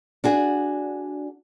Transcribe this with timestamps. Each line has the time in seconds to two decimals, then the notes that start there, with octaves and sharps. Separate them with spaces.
0.24 D4 F#4 G#4